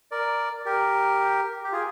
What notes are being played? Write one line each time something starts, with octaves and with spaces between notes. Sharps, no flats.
A#4 D5
G4 A#4
G4
F4 G#4